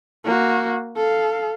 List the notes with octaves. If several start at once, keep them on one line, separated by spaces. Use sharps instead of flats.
A#3 F#4
A4 F5